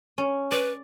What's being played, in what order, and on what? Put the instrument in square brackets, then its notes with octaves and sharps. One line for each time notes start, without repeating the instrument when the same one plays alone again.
[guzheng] C#4
[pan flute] B4 [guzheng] D5